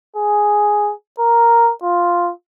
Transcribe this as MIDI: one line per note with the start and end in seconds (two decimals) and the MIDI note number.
0.17 0.93 68
1.20 1.71 70
1.83 2.32 65